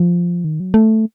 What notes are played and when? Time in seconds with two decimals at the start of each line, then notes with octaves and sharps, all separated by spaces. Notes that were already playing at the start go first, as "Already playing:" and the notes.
Already playing: F3
0.44 D#3
0.60 F#3
0.74 A3